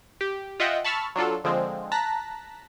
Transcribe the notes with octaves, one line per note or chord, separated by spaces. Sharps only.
G4
F4 D#5 E5 F#5 G5
A5 B5 C#6 E6 F6 A6
F#3 D4 F4 A4
D3 F3 G#3 C4
A5 A#5 F#6 A#6 B6